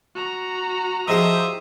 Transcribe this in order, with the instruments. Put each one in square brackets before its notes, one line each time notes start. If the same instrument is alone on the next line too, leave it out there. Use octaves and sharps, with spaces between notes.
[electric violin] F#4 A#5
[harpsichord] F3 G4 [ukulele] E4 G#4 D#5 [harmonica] C5 E5 D#6